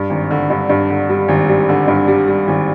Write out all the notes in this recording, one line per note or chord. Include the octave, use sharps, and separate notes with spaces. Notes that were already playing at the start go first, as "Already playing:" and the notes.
Already playing: G2
G#1
D3
G2
G2
D3
G3
G#1
G3
D3
G2
G3
G3
G#1